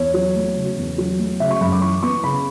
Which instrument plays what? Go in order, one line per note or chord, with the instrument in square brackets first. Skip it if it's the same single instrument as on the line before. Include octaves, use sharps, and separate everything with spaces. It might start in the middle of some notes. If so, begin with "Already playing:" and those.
Already playing: [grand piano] E2 C#5
F#3
A3
C#3
E2
F#3
A3
C#3 E5
C#6
F#2 B5
D6
E3 C#6
B3 C#6
C#3 B5